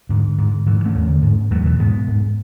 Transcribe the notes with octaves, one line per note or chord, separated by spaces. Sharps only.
G#2 D3
G#2
G#2 E3
E3
A3 C#4
E2
D3
G#2
E2 F#3 A3
B2 E3
G#2 G#3 B3
G#2